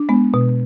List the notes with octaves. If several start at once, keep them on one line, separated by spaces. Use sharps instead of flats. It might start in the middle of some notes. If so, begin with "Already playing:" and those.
Already playing: D4
G#3 B3
B2